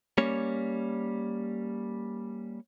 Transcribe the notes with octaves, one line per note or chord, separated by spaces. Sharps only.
G3 A#3 C#4 C#5